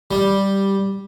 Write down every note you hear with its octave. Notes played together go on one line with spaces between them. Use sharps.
G3